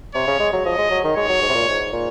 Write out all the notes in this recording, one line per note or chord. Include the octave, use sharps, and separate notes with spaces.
C3 C#5
C#3
G#3
F#3
F3 D#5
G#3
F#3
D#3
G#3 C#5
F#3
G#2
C3
A#2
G#2
A#2